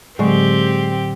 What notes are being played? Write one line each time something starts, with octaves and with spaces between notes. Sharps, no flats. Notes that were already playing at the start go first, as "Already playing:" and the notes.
A2 D3 F#3 G#3 C4 G4